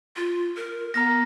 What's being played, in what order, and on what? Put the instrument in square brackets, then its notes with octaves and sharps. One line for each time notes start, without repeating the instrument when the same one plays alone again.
[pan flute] F4
A#4
[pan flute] B3 [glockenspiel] A#5 F6 A#6